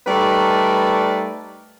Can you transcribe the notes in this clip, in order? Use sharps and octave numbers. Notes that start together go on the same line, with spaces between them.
G3 A3 D#4 A#4 B4 D5